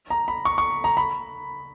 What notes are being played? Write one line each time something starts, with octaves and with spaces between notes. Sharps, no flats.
A#5
B5
C#6
C#6
A#5
B5